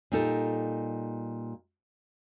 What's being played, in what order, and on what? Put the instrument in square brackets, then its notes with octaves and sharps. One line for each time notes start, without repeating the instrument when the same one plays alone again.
[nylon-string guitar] A#2 G3 D#4 A4